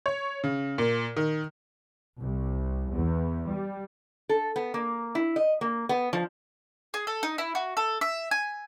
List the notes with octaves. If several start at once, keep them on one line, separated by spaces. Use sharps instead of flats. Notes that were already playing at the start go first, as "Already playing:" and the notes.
C#5
C#3
A#2
D#3
C2
E2
G3
A4
B3
A#3
E4
D#5
A#3
B3
F3
G#4
A4
D#4
E4
F#4
A4
E5
G#5